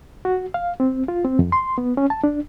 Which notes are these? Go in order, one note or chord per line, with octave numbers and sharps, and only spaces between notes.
F#4
F5
C4
F4
C4
F2
C6
B3
C#4
A5
D4